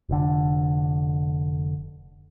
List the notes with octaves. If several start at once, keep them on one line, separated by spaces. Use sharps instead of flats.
F1 D3